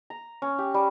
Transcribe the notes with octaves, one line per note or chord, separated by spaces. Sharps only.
A#5
C#4
G4
G3